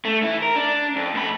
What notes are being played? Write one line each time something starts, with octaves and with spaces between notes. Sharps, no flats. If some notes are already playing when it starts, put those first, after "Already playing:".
A3
E3 E4
A#4
D4
F2
A#2 B5